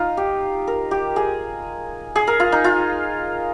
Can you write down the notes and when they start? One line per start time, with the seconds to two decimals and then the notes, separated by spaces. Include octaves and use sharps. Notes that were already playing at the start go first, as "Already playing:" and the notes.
Already playing: D#4 F4
0.17 G4
0.67 A#4
0.91 G4
1.16 G#4
2.16 G#4
2.27 A#4
2.40 F4
2.52 D#4
2.64 F4